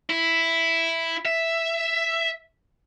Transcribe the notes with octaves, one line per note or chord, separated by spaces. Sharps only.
E4
E5